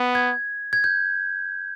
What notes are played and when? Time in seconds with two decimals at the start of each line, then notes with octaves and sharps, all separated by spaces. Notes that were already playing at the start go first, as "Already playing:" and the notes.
Already playing: B3
0.15 G#6
0.73 G#6
0.84 G6